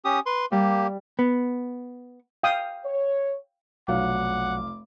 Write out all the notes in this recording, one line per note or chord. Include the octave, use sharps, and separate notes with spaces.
C#4 G4 D#6
B4 C6
G3 A#3 G4
B3
F5 G5 D#6
C#5
F1 B1 F#3 F5 F#5 D6